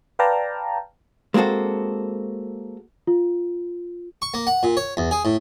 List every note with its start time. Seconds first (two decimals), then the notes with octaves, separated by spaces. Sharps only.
0.19 B4 D5 F5 G5 A5 A#5
1.34 G#3 A#3 C4 F#4 A4
3.07 F4
4.22 C#6
4.34 A#3
4.47 F#5
4.63 A#2
4.77 C#5
4.97 E2
5.11 G#4
5.25 A2